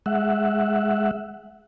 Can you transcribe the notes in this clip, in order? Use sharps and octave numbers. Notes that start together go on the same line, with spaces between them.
G#3 E5 F#5